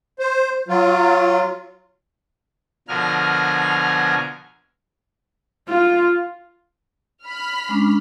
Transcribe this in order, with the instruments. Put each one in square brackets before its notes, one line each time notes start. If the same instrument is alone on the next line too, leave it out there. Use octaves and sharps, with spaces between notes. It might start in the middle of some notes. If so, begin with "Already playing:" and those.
[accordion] C5
F#3 F4
[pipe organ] B2 D3 F3 A#4 G#5 F6
[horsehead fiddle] F4
[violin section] B5 F6
[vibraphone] G#3 C#4 D4